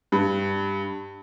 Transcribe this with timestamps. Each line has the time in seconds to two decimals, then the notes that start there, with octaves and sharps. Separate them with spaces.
0.12 G2